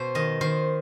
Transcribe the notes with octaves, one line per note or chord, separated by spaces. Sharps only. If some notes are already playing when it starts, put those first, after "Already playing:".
Already playing: B2 C5
D#3 D#5
D#3 C5